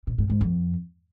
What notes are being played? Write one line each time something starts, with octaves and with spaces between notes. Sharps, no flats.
B2
G#2
G#2
F2